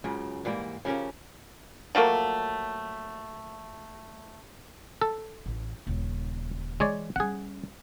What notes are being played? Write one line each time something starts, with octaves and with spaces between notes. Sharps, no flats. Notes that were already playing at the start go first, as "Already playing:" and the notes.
C#2 F#2 C#3
G#2 E3 G3 A#3
C#3 F3 C#4 G4 A#4
F3 F#3 A3 A#3
A4
A1
D#1 C#3
E3 G#3 C#5 D5
G3 C#4 G#4 F#5